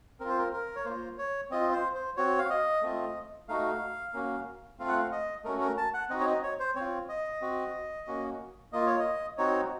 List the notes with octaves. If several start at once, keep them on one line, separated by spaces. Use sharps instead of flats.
C4 F4 A#4 C5
A#4
A#4
C#5
A#3 F4 C5
C#5
C4 F4 D#5
C5
C5
C4 F#4 C#5
F5
D#5
A3 C4 F4
A3 D#4 F#4 F5
A#3 C#4 F#4
A3 C4 F4 F5
F#5
F5
D#5
A3 C#4 F#4 A#4
A#4
A5
F#5
C4 D#4 F#4 D#5
C#5
D#5
C#5
C5
C4 C#5
F4
D#5
C4 F#4
A#3 C#4 F#4
A#3 F4 D#5
C#5
D#5
C4 D#4 F#4 C#5